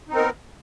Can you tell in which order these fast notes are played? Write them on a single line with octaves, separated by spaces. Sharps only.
D#4 C4 A#4 B3